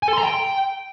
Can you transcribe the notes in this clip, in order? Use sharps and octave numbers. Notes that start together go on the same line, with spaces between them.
G#5
A4
C6
A#5
G5